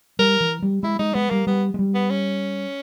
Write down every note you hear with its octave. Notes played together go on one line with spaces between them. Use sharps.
G3 A#4
E3
G3
G#3 E4
G#3 D#4
G#3 B3
G3 A#3
G3 B3
G#3
G3
B3
C#4